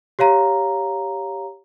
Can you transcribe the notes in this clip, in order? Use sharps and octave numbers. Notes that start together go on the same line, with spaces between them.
G4 C#5 F5 A#5